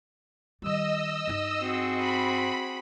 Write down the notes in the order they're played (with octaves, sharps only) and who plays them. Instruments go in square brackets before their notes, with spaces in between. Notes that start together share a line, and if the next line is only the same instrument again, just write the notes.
[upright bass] D#3 G3 [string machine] D#5 E6
[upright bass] G2 D#4
[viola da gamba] C4 F#4 G#4
[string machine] B5